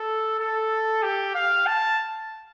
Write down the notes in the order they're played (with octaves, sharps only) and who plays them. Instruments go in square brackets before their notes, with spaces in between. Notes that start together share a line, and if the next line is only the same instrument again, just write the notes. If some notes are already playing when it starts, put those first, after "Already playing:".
Already playing: [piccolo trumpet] A4
A4
G4
F5
A5